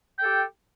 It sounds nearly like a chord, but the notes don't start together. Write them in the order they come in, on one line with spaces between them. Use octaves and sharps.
G5 A4 G4